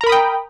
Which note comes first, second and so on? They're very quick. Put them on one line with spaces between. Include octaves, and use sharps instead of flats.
A#5 A#4 B5 D#6 G5